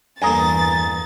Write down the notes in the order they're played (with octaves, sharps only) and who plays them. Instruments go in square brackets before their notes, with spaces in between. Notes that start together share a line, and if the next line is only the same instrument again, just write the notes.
[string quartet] E2 A6 [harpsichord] G2 A#3 A4 [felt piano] G#5 A#5 D#6